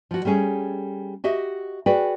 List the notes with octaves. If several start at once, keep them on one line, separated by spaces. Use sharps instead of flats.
F3 F#4
G3 A3 C#4 G#4
F#4 G4 D#5 E5
F#4 G#4 B4 D5 G5